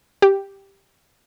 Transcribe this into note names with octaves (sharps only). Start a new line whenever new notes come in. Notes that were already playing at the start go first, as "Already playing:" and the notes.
G4